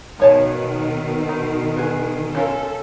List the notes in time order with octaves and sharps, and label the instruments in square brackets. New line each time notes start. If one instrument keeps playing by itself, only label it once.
[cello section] B2 D#3 [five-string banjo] F3 C#5 A5
[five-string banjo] D#4
B3 G#4
[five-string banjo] C#4 F4 A#4 [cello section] A4